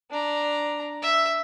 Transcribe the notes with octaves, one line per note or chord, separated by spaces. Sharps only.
D4 A#5
E5